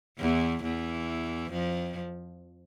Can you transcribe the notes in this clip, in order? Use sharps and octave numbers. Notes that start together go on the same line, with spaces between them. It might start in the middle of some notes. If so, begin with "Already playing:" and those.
E2 E3
E2 E3
F2 F3